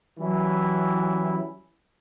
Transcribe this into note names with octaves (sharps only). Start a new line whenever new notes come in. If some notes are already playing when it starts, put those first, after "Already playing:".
E3 F#3 G3 C#4 E4